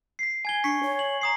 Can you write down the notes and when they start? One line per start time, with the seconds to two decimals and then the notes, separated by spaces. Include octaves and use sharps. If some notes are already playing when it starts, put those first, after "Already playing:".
0.19 B6 C7
0.45 G#5 G#6 G7
0.64 D4 C#6 B6 C#7
0.83 C#5
0.99 F#7
1.21 A#5 D#6 C7